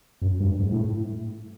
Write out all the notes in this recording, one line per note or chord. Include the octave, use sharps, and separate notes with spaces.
F#2
G2
G#2
A2